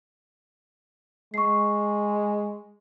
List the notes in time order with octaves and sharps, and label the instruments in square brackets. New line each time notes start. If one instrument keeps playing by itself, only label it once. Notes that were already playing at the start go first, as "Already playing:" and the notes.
[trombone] G#3 [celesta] C#6 C7